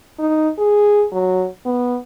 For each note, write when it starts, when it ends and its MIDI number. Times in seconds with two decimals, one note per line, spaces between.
0.19 0.49 63
0.58 1.03 68
1.12 1.46 54
1.66 1.97 59